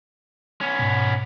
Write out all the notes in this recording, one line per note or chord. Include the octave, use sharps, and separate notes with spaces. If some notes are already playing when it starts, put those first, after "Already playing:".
B3 C#4
G#2 B2